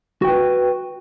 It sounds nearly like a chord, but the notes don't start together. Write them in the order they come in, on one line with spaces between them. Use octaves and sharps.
F#4 G5 B4